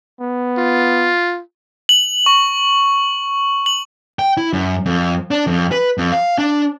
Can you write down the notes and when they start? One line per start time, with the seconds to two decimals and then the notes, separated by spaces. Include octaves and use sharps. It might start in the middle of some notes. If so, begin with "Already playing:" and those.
0.21 B3
0.58 F4
1.89 F#7
2.26 C#6
3.66 F#7
4.19 G5
4.37 E4
4.53 F#2
4.86 F2
5.31 D4
5.47 F2
5.72 B4
5.98 F2
6.12 F5
6.38 D4